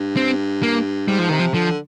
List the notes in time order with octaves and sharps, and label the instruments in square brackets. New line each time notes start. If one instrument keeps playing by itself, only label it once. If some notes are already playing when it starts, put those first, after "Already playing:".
Already playing: [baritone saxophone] G2
[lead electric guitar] C4
A#3
[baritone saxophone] G#2 [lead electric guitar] G3
[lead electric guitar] F3
[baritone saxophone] C3 [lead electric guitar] D#3
[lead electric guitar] F3
[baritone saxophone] D3 [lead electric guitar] F3